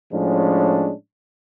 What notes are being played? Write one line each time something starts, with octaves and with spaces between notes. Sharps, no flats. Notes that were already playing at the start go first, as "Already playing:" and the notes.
A2 F3 G#3 C#4 D4